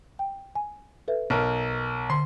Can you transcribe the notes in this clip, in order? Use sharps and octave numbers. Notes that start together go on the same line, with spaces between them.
G5
G#5
A4 B4 E5
B1 A#4
D3 C6